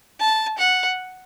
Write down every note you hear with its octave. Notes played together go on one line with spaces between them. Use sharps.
A5
F#5